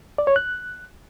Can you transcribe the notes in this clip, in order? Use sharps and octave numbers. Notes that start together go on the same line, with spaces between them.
D5
C#5
F#6